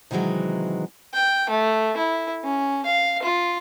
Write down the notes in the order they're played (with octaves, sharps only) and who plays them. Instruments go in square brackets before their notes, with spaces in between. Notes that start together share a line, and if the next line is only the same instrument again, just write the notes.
[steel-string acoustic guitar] C3 D#3 E3 F#3 G#3
[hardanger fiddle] G5
A3
E4
C#4
F5
F4